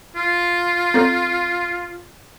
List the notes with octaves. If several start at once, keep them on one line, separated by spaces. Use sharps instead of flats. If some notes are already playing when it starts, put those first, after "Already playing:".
F4
C4 A4